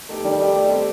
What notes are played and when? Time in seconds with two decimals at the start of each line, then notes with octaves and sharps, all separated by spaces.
0.09 A3 D#4 G4
0.24 D#3 G3
0.39 G3 A3 D#4 G4
0.55 A3
0.70 C4 G4